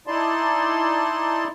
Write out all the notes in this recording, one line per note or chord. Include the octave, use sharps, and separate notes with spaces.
D#4 E4 D5 A5 C6